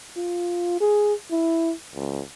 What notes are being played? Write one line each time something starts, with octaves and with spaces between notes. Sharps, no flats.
F4
G#4
E4
C#2